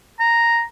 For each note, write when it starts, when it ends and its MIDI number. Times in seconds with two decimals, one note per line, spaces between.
0.20 0.62 82